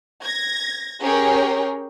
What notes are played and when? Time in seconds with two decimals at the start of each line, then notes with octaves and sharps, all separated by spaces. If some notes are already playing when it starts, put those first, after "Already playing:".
0.24 G#6 A#6
1.01 C#4 G4 G#4 A#4 C#5 G5